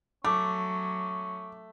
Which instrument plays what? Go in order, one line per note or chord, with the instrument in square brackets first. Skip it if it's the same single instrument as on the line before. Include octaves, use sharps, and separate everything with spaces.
[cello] F#3 [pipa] A3 [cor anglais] C#4 [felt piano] D6